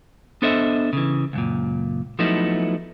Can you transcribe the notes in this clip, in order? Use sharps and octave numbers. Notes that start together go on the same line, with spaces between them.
B3 D4 A4 C5 D#5 E5
C#3 E3
C#2 F#2 A#2
F3 F#3 A3 B3 D#4 E4